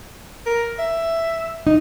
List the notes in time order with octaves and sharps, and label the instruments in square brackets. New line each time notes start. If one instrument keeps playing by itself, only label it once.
[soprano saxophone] A#4
E5
[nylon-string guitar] D#4